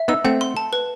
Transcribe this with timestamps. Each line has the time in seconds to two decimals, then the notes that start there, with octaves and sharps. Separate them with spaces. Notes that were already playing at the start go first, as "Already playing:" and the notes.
Already playing: E5
0.08 B3 D#4 E6
0.25 A3 C4 F#5
0.41 C6
0.57 A5
0.73 B4